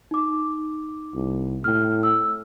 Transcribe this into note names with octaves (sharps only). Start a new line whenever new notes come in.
D#4 D6
C2
A2 G5 F6
E6